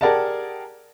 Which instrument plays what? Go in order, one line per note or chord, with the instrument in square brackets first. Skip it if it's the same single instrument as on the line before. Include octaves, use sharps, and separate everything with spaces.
[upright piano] G4 G#4 A#4 D5 F#5 A5